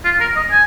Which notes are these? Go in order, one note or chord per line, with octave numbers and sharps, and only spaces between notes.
F4
A#4
D#5
G#5